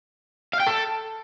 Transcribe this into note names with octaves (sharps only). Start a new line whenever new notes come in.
F5
G5
A4